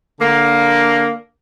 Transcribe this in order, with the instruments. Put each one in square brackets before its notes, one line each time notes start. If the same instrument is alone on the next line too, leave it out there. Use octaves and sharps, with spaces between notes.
[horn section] D3 A#3